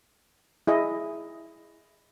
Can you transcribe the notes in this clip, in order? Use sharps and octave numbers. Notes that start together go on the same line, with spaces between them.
E4 G#4 D#5